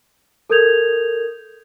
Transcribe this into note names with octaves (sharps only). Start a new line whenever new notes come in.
A4 A#4 D#6 G6 G#6 F7